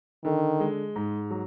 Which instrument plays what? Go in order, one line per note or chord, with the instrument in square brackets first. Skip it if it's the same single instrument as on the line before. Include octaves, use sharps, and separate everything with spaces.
[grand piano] D3 [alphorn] D#3
[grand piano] G#3
G#2
F#3